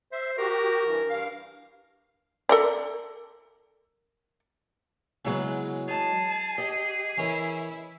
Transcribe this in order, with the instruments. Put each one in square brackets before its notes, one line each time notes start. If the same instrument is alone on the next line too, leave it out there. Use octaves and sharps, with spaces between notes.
[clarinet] C5 [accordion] E5
[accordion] F#4 G4 [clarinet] A#4
[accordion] G2 E3
G2 F5
[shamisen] A4 A#4 D5
[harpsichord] C#3 B3 [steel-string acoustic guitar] E3 F#3 G#3
[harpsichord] D#4 [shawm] G#4 [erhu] A5
[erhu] G4 [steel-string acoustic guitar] D#5
[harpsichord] E3 C#4 A#4 [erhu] E4